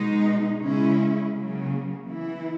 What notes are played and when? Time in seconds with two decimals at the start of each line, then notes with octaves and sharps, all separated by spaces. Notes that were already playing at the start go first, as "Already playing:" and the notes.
Already playing: B2 G#3 D#4
0.62 C#3 G#3 C#4 E4
1.34 C#3 F#3 A#3
2.06 E3 B3 E4